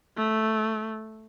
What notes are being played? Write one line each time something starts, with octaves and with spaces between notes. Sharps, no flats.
A3